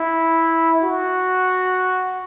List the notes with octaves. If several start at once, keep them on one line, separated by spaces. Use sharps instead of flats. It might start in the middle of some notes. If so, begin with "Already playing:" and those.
Already playing: E4
F#4